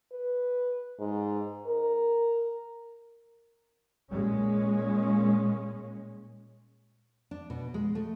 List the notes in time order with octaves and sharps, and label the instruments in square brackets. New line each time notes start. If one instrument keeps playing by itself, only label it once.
[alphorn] B4
G#2
A#4
[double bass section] A#2 G#3 C#4
[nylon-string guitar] D4
B2
G#3
A3